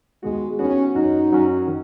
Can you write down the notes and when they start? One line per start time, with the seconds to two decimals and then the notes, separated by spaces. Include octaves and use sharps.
0.23 D#2 D#3 G#3 B3 F#4
0.59 D#2 D#3 B3 C#4 F#4
0.95 F#2 F#3 C#4 D#4 F#4
1.32 F#2 F#3 C#4 F#4
1.68 D#3